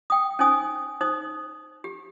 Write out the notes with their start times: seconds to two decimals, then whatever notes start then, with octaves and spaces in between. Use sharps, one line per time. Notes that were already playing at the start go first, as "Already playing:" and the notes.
0.10 G5 D#6
0.39 C#4 D#4 C5 G#5 D#6
1.01 D#4 C5 D#6
1.84 G4